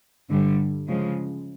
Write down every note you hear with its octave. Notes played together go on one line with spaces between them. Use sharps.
G2 D3 G3
C#3 F3 G#3